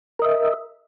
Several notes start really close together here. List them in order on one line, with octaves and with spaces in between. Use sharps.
A#4 D#5 E5